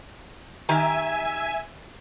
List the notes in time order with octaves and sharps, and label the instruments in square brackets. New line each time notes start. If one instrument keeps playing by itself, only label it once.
[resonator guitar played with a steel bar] D#3 G4 A#5 [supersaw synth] E5 G#5